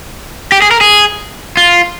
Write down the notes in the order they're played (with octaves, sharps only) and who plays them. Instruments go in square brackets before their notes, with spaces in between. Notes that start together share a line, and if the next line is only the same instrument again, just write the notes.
[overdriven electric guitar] G4
G#4
A#4
G#4
F4